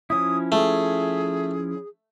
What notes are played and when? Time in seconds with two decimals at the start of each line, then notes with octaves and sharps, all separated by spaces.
0.10 F3 C#4 E4 D#6
0.52 A3 G#4